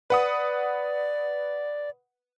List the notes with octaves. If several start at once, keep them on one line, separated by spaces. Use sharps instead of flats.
B4 D5 F#5 D#6